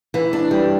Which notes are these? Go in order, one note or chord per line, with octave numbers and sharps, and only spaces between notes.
E3
D4
G3